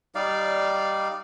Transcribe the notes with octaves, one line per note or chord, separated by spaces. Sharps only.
G3 D#4 D5 F5